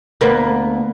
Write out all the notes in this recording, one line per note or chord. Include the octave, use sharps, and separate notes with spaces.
D2 A#3 B3